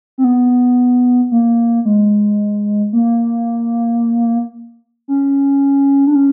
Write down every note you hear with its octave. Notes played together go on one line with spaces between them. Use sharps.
C4
B3
A#3
G#3
A#3
C#4
D4
C#4